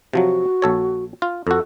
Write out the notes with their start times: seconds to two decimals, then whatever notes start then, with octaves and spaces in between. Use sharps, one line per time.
0.13 C3 F3 F#3 F#4
0.62 A#1 A4 C#5
1.22 F4
1.47 F2 F#4 A4